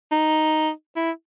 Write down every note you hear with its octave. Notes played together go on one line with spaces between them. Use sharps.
D#4
E4